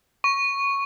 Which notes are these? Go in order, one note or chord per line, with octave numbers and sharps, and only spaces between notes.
C#6